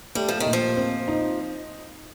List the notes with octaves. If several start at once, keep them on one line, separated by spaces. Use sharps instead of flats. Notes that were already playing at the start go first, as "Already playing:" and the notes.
G3 A3
F3
D#3
A#2
F3
C4
D#4